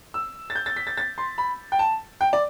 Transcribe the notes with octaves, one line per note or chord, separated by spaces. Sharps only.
E6
A6
G6
A6
B6
A6
A6
C6
B5
G5
A5
G5
D5